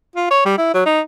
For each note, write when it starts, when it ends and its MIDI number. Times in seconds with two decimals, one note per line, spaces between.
0.16 0.27 65
0.31 0.40 73
0.45 0.56 55
0.58 0.69 64
0.74 0.82 54
0.86 1.01 63